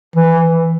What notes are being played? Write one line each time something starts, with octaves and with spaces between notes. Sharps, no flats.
E3